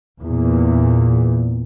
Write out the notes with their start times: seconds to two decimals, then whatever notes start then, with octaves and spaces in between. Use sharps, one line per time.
0.23 E2 A#2